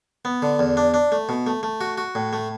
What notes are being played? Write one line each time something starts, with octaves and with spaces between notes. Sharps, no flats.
B3
D3
E2
D4
D4
A3
B2
A3
A3
F#4
F#4
A2
A3